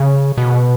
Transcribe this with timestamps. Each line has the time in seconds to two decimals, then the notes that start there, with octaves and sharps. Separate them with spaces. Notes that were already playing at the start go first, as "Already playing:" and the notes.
Already playing: C#3
0.38 B2